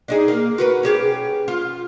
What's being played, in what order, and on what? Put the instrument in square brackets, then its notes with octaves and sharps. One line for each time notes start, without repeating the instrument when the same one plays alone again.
[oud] D4 D#4 G#4
A#3
F#4 A#4 B4
C#4 G4 G#4
F4